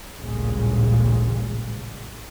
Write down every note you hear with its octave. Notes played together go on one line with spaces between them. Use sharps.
A1 D2 A#2 C#3 G3 G#3